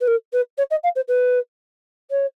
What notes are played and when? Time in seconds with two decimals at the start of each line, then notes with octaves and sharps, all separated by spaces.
0.01 B4
0.07 A#4
0.33 B4
0.57 C#5
0.70 D#5
0.83 F5
0.95 C5
1.08 B4
2.10 C#5